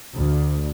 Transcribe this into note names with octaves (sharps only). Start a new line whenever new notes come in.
D2